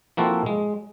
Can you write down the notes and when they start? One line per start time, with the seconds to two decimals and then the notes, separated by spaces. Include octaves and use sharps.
0.17 F3 A#3 C4 E4 F#4 A4
0.46 G#3